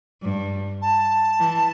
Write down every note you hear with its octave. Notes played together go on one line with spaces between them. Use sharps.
G2
A5
E3